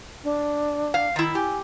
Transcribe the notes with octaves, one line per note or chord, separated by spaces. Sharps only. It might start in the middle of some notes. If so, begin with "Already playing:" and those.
D4
F5
D#3 E4
G4 G#5